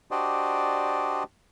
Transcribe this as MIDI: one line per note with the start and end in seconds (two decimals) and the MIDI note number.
0.11 1.23 62
0.11 1.23 66
0.11 1.23 67
0.11 1.23 72
0.11 1.23 74
0.11 1.23 75